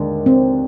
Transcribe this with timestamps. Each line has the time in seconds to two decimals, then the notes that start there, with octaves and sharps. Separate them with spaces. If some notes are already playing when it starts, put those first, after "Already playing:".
Already playing: D#2 D3 G#3 D4
0.26 C4